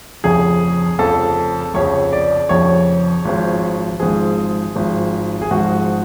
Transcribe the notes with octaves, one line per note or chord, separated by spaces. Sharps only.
F1 F2 C#3 G#4
F1 F2 C#3 A4
F1 F2 C#3 C#5
D5
F1 F2 C#3 C#5
G#1 G#2 F3
G#1 G#2 F3 G#4
G#1 G#2 F3
G#4
G#1 G#2 F3 F#4